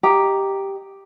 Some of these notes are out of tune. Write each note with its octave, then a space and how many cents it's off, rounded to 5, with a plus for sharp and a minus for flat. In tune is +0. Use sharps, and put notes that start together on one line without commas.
G4 +0 D#5 +0 A#5 +0